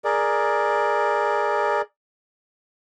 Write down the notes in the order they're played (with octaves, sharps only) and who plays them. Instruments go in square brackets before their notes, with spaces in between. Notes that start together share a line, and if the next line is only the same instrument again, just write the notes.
[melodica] G#4 A#4 D5